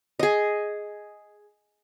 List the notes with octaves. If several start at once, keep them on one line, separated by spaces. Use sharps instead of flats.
G#4 D#5